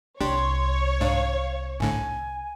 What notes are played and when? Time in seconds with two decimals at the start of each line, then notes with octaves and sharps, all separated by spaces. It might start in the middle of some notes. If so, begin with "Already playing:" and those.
0.21 C2 D4 G4 C#5 C6
1.00 G#2 D4 F5
1.80 G#1 A2 D3 G#5